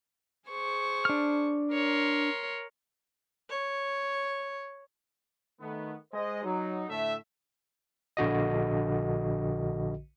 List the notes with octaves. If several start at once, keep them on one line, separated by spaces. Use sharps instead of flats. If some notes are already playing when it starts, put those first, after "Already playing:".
G#4 C5 C#6
D4 F6
A#4 C#5 C6
C#5
D#3 A3 B3
G#3 C5 D#5
F#3 D#4
A2 D3 A3 E5
A#1 D3 F#4 D#5